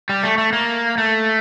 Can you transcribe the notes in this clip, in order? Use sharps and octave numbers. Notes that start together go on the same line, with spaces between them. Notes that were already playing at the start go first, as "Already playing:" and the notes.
G3
A3
A3
A#3
A3